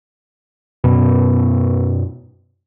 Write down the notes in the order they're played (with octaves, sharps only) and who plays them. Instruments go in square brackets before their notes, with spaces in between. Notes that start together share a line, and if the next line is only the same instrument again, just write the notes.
[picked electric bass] F#2 B2 B3